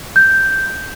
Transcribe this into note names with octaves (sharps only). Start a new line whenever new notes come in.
G6